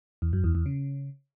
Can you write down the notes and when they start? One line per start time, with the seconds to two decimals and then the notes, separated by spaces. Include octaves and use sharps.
0.22 E2
0.33 F#2
0.44 E2
0.55 E2
0.66 C#3